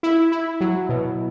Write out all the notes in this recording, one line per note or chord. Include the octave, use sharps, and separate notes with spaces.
E4
E4
F#3
B2